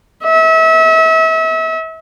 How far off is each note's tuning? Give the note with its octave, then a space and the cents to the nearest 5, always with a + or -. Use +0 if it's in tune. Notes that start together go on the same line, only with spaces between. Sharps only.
E5 -35